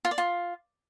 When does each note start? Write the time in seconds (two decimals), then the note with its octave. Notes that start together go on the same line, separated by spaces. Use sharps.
0.05 F4
0.11 D5
0.18 F4